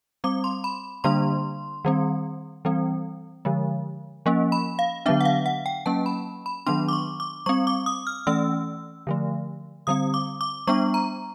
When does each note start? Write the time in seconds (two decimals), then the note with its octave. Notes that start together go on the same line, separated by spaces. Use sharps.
0.24 G3 C4 D6
0.44 C6
0.64 B5
1.04 D3 G3 A#3 D4 C6
1.85 D#3 G3 C4
2.65 E3 G3 C4
3.45 D3 F3 G#3
4.26 F3 A#3 C#4
4.52 B5
4.79 F5
5.06 D3 F#3 B3 D4 E5
5.21 F#5
5.25 F5
5.46 F#5
5.66 G5
5.86 F#3 A#3 C#4 A5
6.06 B5
6.46 B5
6.66 D#3 F#3 B3 D4 C6
6.88 D6
6.93 C#6
7.20 D6
7.46 G3 C4 C#6
7.67 D6
7.86 D#6
8.07 F6
8.27 E3 A3 C#4 E6
9.07 D3 F3 A3
9.87 D3 G3 C4 D#6
10.14 D6
10.41 D6
10.67 G3 B3 D4 C#6
10.94 A#5